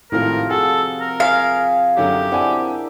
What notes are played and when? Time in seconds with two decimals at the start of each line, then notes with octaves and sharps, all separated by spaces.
0.12 G#1 A2 C3 F3 A#4 F5
0.50 F#4 G#4 A4
1.00 A#4
1.20 G#4 F5 B6
1.97 F#2 D3 F#3 G4
2.31 C4 D4 E4 A#4 F#5 G#5